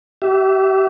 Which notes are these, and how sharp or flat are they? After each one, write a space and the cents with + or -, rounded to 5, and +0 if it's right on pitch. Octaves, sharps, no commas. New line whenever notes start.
G4 -35 E5 +0